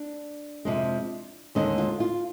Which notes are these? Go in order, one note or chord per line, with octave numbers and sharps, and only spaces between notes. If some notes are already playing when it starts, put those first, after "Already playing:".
Already playing: D4
F2 C3 F3 G#3
D#2 D3 G#3 C4 D#4
F4
F4